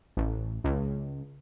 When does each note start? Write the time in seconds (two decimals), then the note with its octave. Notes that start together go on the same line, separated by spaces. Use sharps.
0.17 A1
0.64 C#2